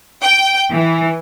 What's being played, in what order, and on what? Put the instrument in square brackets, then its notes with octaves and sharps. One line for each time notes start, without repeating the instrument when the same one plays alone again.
[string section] G5
E3